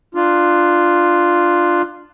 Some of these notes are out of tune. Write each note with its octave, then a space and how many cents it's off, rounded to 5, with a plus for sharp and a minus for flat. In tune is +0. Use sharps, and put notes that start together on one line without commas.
D4 +20 F4 +0